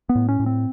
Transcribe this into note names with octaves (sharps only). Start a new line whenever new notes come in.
B3
A2
C#4
A2
C4